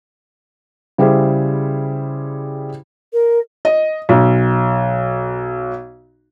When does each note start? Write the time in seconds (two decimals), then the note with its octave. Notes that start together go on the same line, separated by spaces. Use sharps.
0.98 C#3 G3 E4 G#4 C5
3.13 A#4
3.65 D#5
4.09 B1